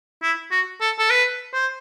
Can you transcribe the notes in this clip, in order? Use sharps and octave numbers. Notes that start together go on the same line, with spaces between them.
E4
F#4
A4
A4
B4
C5